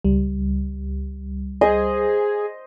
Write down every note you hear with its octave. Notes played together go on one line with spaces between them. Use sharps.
C#2 G3
G#4 C5 D#5